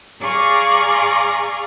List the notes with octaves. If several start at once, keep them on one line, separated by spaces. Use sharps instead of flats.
G#4 D5 F5 A#5 C#6